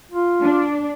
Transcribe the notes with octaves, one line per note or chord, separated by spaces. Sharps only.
F4
D4